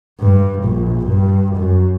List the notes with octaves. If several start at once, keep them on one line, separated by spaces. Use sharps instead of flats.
G2
A#1
G2
F#2